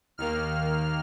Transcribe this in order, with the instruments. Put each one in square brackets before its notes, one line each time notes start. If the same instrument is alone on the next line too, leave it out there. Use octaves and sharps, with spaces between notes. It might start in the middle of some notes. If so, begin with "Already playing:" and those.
[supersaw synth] D#2 D#3 A#3 F6